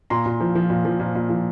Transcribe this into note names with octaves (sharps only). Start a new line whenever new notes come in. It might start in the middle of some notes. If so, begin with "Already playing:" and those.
A#2 A#5 C6
A#2
F3
F3
A#2
F3
A#2
A#2
F3